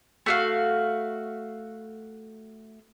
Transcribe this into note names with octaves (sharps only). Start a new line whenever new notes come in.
A3 F#4 F5